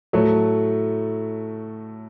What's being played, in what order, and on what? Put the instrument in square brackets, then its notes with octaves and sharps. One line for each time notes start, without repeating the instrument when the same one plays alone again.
[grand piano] A2 F#3 A3